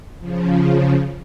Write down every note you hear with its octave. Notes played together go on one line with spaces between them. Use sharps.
C#3 F3